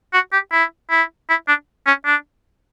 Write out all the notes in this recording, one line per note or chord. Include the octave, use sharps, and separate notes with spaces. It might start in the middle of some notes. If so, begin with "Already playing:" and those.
F#4
G4
E4
E4
E4
D4
C#4
D4